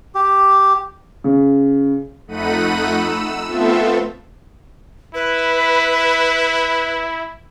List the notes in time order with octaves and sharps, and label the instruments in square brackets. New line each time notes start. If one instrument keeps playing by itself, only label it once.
[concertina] G4
[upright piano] C#3
[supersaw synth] F2 A3 D#4 F#5 B5 D#7
E6
A3 B3 C4 F4 A4 E5
[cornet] E4 [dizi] B4